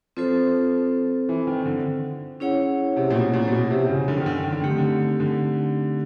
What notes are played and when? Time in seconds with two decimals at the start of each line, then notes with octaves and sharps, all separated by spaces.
0.17 F3 C4 F4 A4 C5
1.29 E3
1.47 D#3
1.66 D3
2.40 C#4 E4 G#4 C#5 F#5
2.96 C3
3.10 A#2
3.15 B2
3.33 A#2
3.47 A#2
3.52 B2
3.71 C3
3.90 C#3
4.08 D3
4.17 D#3
4.26 D3
4.35 D#3
4.43 D3
4.52 D#3
4.61 D3 A3 C4 D#4 G4
4.69 D#3
4.78 D3
5.20 D3